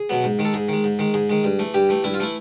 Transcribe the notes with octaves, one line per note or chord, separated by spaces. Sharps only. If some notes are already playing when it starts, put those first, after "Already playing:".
Already playing: G#4
B2 F#3 B3
G#2
D#3 G#3
A4
G#2 G#4
D#3 G#3
G#2
D#3 G#3
G#2 G#4
D#3 G#3
G2
E3 A3
G2 G4
E3 A3
G2 E4
F4
E3 A3 E4